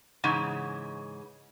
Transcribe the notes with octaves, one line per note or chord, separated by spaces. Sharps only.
G#2 C#3 E3